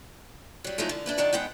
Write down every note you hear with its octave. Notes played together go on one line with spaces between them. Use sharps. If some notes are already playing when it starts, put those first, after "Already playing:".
F#3 G3
F3 F#3 G#3 A3 D#4 E4
D3
D4 E4 B4
F2 D#3 D4 D5 F#5
G#2 G#3 B3 F#5 G5